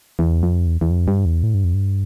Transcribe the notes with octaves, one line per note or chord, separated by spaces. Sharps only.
E2
F2
E2
E2
F2
G2
E2
A2
G2
F2
G2